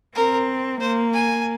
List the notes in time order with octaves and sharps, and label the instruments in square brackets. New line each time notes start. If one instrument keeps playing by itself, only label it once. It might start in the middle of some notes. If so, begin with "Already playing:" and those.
[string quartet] C4 [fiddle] A#4
[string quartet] A#3 [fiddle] C5
[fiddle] G#5